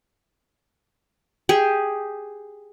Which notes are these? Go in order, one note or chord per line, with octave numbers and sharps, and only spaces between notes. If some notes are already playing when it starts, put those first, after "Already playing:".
G4 G#4